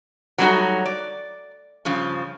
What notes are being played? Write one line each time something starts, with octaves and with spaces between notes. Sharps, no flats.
F#3 G3 A3 C#4 D#4 F#4
D5
G2 C#3 F3